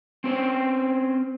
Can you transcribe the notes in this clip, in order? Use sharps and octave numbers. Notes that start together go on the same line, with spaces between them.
C4 C#4 C5